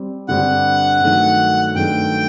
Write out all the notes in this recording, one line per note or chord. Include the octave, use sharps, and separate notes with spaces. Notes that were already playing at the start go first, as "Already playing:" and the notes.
Already playing: G3 C4
G2 D3 G3 C4 F#5
G2 D#3 F#3 A3
G2 D#3 F#3 A3 G5